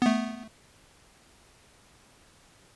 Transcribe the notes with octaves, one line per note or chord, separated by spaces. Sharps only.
A3 B3